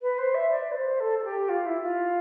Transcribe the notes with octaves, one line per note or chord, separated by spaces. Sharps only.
B4
C5
E5
D5
B4
C5
A4
A4
G4
F4
E4
F4